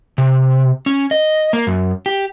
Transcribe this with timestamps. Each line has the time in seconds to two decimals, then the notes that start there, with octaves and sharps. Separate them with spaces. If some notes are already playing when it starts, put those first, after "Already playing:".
0.18 C3
0.86 C#4
1.11 D#5
1.53 A#3
1.67 F#2
2.06 G4